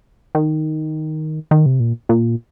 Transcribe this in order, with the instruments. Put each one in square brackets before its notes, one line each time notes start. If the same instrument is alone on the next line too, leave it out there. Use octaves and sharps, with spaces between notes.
[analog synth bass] D#3
D#3
C3
A#2
A#2